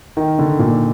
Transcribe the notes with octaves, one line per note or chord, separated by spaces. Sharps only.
D#3
D3
A#2